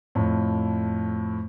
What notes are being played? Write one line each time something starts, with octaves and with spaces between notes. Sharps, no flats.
F2 A2